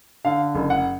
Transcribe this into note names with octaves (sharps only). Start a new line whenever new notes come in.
D3 F5
F#1
F#5